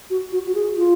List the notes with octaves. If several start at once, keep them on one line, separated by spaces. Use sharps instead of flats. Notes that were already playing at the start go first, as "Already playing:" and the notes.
F#4
F#4
F#4
G#4
F4